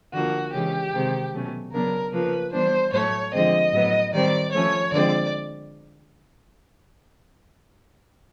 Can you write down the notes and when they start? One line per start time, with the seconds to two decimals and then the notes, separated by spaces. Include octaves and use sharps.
0.13 D3 F3 A#3 F#4
0.53 C#3 E3 G#3 C#4 G4
0.93 C3 D#3 G#3 C4
1.33 B2 F#3 A3 C#4
1.73 C#3 F#3 B3 D4 A#4
2.13 C#3 F3 A#3 B4
2.52 E3 G3 B3 D4 C5
2.92 A2 F#3 A3 C#5
3.33 D3 F3 G#3 C4 D#5
3.72 A2 F#3 B3
4.13 D#3 G3 C4 D5
4.52 F3 A3 C#4 C#5
4.92 D3 F3 G#3 C4 D5